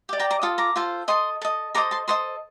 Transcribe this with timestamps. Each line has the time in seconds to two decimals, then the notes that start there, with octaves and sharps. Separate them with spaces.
0.09 G4 D5
0.19 G5 A#5
0.31 A#5 D6
0.42 F4 A4 D#6
0.58 A#5 D6
0.76 F4 A4 C5
1.08 A4 D#5 C6 D#6
1.42 A4 D#5
1.74 A4 C5 D#5 A#5 D6
1.91 A5 C6
2.08 A4 C5 D#5 C6 D#6